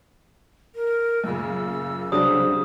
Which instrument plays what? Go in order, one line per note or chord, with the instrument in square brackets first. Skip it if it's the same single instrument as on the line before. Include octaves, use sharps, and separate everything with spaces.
[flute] A#4
[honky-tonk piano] F#2 A#2 C#3 [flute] E6
[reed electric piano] C2 F#3 D4 [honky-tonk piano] C#3 G4 [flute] C5 [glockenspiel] D#6